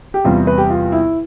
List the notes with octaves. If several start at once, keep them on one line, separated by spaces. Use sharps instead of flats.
G4
E2 C3 G3 F4
B4
G4
F4
E4